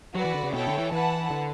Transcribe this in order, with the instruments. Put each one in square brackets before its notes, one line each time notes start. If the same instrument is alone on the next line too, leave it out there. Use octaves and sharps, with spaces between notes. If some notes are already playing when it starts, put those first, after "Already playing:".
[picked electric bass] F#3 [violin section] F#4 B4 D5
[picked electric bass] E3
D3
C#3
[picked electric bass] B2 [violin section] E4 A4 C#5 G5
[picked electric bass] D3
E3
[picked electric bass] E3 [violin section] E4 B4 F#5 A5
[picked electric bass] D3